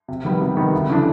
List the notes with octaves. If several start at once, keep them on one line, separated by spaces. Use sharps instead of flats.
C3
D#3 G3 B3
C3
D#3 G3 B3
D2
C#3 E3 A3 D4